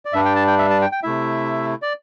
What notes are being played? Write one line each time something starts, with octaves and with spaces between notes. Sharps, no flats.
D5
G2 G3 D4 E5
G5
A5
G5
E5
A5
G5
G5
C3 A3 E4 E5
D5